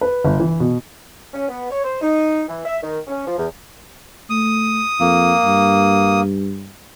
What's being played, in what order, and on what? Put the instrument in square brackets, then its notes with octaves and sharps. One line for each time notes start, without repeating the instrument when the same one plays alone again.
[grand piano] B4
G1
E3
B2
[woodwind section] C#4
B3
C#5
C5
D#4
E3
E5
D#3
C#4
F3
E2
[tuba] A3 [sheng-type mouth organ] D#6
[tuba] F2 [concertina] A#3
[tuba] G2